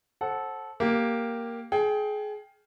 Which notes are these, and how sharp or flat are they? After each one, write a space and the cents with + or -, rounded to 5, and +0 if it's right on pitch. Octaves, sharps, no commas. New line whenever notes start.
A4 -15 C5 +25 F#5 +0
A#3 +0 G4 +0 G5 +0
G#4 +25 G5 +0